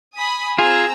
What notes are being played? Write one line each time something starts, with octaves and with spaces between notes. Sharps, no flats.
G#5 B5 D#6
C4 F4 G#4 G#5 A#5 E6